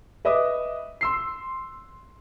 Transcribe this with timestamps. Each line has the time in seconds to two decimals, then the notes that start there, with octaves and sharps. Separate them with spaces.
0.25 B4 D#5 E5 D6 D#6
1.01 C6 E6 C7